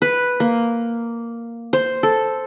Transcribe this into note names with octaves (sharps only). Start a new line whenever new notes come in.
B4
A#3
C5
A4